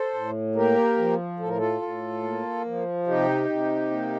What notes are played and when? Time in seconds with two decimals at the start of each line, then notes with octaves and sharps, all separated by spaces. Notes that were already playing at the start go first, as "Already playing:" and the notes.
Already playing: A4 C5
0.14 A2
0.55 A#3 G4 A#4
0.97 F3
1.40 A2 A4
1.48 A#4
1.58 F4 A4
1.82 A2
2.23 A#3
2.65 F3
3.07 C3 D#4 G4
3.50 C3
3.91 A#3